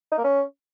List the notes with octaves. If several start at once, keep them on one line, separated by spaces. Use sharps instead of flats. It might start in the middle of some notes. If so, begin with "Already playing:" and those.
D#4
A#3
C#4